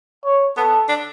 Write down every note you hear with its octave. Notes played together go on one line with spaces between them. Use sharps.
C#5
B3 A4
D4